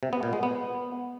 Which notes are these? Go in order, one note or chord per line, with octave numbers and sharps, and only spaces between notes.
C3
B3
A#2
G#3
B3